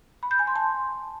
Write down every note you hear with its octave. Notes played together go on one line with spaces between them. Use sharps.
B5
G6
G#5
C6
A5